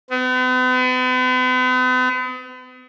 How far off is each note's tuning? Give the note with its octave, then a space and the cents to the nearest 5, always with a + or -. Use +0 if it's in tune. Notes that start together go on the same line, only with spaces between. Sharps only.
B3 +45